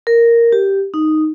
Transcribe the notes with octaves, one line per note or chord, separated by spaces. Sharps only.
A#4
G4
D#4